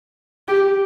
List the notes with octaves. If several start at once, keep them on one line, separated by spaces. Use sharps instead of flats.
G4